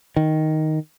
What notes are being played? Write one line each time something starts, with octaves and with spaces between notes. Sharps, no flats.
D#3